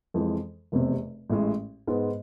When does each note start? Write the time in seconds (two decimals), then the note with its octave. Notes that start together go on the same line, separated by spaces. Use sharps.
0.14 F2 E3 G#3
0.72 F1 E2 C3
1.30 A1 A2 G#3
1.87 G#2 G#3 B3